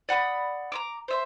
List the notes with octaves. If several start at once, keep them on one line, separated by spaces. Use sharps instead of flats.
D5 F#5 B5 D#6
A#5 C6 D6
C5 E5 C6